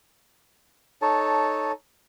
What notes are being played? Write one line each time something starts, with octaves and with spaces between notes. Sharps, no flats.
D#4 A4 C#5 A5